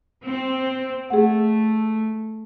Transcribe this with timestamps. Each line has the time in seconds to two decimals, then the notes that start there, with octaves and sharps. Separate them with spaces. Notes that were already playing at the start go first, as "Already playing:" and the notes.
0.24 C4
1.10 A3 G#4 F#5